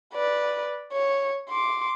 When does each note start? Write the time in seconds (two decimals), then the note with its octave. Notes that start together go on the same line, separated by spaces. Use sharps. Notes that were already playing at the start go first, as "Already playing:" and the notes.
0.14 B4 D5
0.93 C#5
1.50 C6 D6